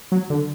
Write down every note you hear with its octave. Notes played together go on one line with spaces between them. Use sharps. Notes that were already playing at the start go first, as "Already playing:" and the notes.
F#3
D3